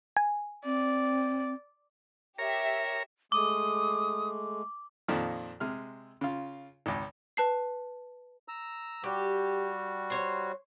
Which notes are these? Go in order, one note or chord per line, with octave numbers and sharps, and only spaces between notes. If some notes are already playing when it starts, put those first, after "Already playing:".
G#5
C4 D5
G4 A#4 C#5 E5 A#5
G#3 A3 D6 D#6
F2 A#2 D#3 F3
C3 G#3 F6
C#3 F4
G#1 C#2
B4 A5 C7
A#5 E6
G3 F#4 G4
C5 C#5